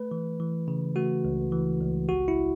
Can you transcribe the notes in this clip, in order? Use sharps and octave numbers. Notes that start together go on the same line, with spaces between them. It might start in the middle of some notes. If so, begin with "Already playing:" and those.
Already playing: A3 B4
E3
E3
C#3
A3 F#4
C#2
E3
C#2
A1 F#4
E4